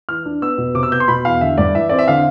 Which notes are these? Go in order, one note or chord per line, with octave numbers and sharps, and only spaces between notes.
E3 F6
D4
B3 E6
B2
C3 D6
E6
B3 G6
C6
B2 B5
E2 F5
D3 E5
G2 D5
E3 E5
C4 D5
E5
D3 F5